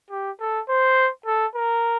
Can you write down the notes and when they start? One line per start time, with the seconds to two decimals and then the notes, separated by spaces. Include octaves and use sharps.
0.11 G4
0.40 A4
0.69 C5
1.26 A4
1.55 A#4